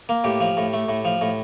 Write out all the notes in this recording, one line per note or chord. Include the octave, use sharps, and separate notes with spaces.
A#3
A2 G4
F3
A2
A3
A2
F3
A2